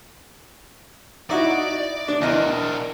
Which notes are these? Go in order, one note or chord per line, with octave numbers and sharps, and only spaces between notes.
D#4 E4 F#4 D5
D4
E2 D4 A#4 D#5